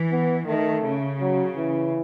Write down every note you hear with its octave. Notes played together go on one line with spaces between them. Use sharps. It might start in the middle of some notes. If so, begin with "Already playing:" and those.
Already playing: E3
B3
D#3 A3
C#3
F#3
E3